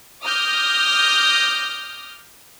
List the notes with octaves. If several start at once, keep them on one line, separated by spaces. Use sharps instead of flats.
D6 D#6 F6 G6 A#6